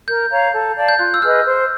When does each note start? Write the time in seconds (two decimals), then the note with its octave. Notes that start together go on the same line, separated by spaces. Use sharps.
0.08 A#4 G6
0.31 C#5 F5 A#5
0.54 A4
0.76 D5 F5 A5
0.89 G6
0.99 F4 F#6
1.14 E6
1.22 G#4 B4 D#5 F6
1.46 C5